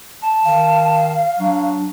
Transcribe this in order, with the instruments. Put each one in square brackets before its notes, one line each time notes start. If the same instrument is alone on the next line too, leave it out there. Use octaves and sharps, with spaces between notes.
[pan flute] A5
[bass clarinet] D#3 [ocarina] F5
[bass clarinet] F#3 [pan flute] D4